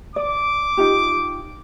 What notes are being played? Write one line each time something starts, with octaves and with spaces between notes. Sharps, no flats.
D5 D6
D#4 F4 G4